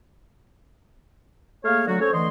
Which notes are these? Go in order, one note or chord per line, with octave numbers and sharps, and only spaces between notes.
A3 A#3 G#4 C#5 F5
D3 F#3 A3 F#4
C#4 A4 C5 C#5
D3 E3 A3 D#5 C6